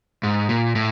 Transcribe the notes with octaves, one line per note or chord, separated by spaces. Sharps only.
G#2
A#2
A2